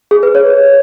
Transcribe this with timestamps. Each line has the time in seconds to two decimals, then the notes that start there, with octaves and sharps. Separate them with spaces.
0.11 G#4
0.23 B4
0.35 C#5